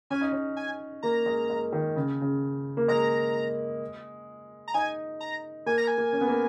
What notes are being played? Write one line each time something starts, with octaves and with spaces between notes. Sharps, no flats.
C#4 G#5
D#4
C#4
G#5
A#3 A#5
G#3
G#3
D#3
C#3
C#3
A#3
G#3 A#5
A#5
D#4 G#5
A#5
A#3 G#5
A#5
G#5
A#3
C#4
B3
A#3